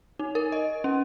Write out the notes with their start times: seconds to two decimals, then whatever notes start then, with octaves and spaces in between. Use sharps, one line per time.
0.20 D#4
0.35 A#4
0.52 D#5
0.84 C#4